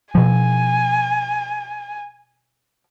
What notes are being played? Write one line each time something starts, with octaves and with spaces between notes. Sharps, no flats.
B2 F3 G#5